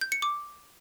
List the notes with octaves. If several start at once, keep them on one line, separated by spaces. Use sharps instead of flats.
G6
C#7
D6